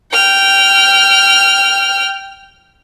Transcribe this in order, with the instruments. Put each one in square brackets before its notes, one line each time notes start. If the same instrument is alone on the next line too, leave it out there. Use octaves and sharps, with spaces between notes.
[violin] G5 F6